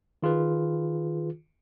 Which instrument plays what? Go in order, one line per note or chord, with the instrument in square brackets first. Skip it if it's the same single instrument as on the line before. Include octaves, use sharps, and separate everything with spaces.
[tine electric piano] D#3 F4 G#4 B4